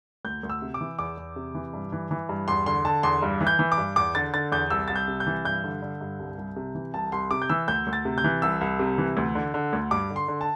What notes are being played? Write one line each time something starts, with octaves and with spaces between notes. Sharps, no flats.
D2 G6
D2
E6
C3
D6
E3
E2 D6
E2
C3
E3
G2
E3
E3
G2
E2 C6
D3 C6
D3 A5
E2 C6
G2
E3
G6
E3
D6
G2
E2 D6
D3 A6
D3 A6
E2 G6
C2 E6
C2 A6
G6
C3
G6
E3
G2 G6
D3
D3
G2
C2
C2
C3
E3
C2 A5
C2 C6
C3 D6
G6
E3 E6
D2 G6
D2
A6
C3
G6
E3
C2 E6
C2
C3
E3
D2
D3
D3
D2
G2 D6
D3
C6
D3
A5